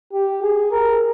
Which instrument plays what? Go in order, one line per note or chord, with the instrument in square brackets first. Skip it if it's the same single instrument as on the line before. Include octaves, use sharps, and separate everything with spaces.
[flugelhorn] G4
G#4
A#4